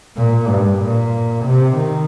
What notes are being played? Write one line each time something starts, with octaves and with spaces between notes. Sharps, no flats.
A#2
G2
A#2
C3
D#3